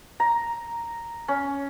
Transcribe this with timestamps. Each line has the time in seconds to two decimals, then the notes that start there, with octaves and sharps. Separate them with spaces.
0.20 A#5
1.28 C#4